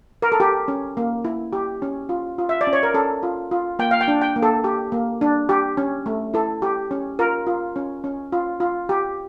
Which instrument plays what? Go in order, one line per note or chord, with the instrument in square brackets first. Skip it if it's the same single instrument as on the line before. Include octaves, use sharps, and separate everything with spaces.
[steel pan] A#4
A4
G4
C#4
A#3
E4
G4
C#4
F4
F4
E5
D5
C#4
C#5
A#4
C#4 A4
F4
F4
A#3 G5
F5
G5
D4
G5
A#3
A4
G4
A#3
D4
G4
C#4
A3
E4 A4
G4
C#4
F4 A#4
F4
C#4
C#4
F4
F4
G4